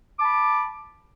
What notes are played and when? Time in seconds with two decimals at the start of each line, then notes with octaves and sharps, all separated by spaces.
0.18 D6
0.21 A5
0.25 B5